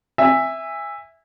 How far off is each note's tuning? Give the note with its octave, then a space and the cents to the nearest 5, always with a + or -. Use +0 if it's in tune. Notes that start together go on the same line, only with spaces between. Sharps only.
E5 +0 G#5 -25